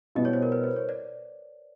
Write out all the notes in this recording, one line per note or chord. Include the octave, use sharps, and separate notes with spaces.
B2 G3 B3 E4 D#5
C#5
C5
A#4
B4
C5
C#5
D5